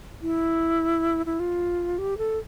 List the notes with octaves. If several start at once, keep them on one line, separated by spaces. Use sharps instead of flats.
E4
E4
F4
G4
A4